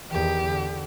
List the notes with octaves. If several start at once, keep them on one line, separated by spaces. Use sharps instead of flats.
E2 D#3 G4
D3